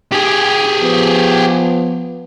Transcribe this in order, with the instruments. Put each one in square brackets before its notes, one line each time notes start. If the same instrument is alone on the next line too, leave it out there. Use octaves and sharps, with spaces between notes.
[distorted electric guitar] G4 G#4
[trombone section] F3 B3